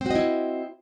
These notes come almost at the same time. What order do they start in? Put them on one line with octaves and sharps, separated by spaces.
C4 F#4 D#5 E4